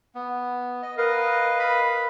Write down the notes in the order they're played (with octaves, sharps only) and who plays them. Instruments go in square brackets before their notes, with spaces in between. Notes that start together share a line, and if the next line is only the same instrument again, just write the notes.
[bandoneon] B3
D#5
[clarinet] A#4 [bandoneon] B4 D#5 F5
[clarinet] B5